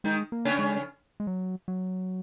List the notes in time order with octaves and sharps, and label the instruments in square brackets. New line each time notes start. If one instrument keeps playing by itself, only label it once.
[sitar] D#3 D#4 [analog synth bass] G#3
[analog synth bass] A#3
[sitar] C#3 C#4
[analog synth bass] G#3
G#3
F#3
F#3